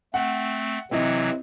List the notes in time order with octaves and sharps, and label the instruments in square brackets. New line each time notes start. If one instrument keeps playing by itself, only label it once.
[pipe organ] A3 C4 [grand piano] F#5
[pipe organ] C3 E3 F#3 [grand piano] C4 E4 D#5